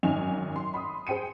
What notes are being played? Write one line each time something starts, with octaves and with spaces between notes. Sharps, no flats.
G#1 F#2 D#4 G#5 F7
C6
B5 C6 D#6
G#4 C5 G5 C#7 D#7